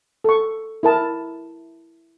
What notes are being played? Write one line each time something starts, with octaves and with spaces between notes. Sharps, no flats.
A4 C#6
E4 A#4 A5